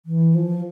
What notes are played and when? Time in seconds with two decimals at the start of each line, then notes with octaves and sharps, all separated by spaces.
0.06 E3
0.35 F3